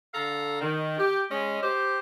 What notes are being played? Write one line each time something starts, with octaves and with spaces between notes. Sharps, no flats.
D3 A4 F5 A#5
D#3
G4
G#3 C#4 D#5
G4 C5